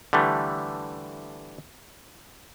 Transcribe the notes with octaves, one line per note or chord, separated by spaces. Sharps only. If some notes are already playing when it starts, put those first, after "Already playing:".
D3 E3 G3 A3